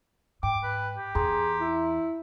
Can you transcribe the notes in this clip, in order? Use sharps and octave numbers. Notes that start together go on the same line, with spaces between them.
G#2 G5 D6
B4
G4
E2 G#4 A#5 C6
E4